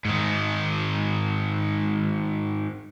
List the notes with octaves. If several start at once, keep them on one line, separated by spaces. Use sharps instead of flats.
G#2 D#3